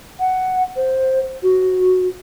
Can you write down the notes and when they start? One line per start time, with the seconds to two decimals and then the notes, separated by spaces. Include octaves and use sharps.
0.20 F#5
0.76 C5
1.43 F#4